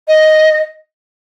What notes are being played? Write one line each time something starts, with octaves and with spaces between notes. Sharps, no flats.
D#5